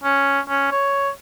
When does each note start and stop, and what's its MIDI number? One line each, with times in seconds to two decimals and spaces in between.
0.04 0.40 61
0.49 0.68 61
0.71 1.10 73